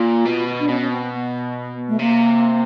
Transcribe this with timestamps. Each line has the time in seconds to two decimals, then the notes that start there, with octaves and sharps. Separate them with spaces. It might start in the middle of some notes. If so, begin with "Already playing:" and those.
Already playing: A#2 F4
0.25 B2
0.59 D4
0.68 B2 C#4
0.80 C#4
0.90 C4
1.01 C4
1.12 B3
1.88 A3
1.99 C3 A#3